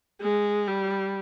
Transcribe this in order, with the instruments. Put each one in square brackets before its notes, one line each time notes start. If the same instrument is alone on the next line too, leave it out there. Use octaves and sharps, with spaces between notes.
[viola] G#3
G3